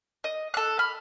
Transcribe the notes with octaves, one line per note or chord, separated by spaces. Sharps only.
D#5
A4 F#6
B5 F6